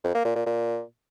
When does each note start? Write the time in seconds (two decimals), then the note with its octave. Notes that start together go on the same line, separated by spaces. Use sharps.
0.04 F2
0.14 A#3
0.25 A#2
0.35 A#2
0.46 A#2